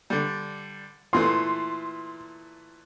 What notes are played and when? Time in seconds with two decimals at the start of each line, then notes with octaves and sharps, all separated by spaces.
0.10 D3 G3
1.13 A#2 E3 A3 C6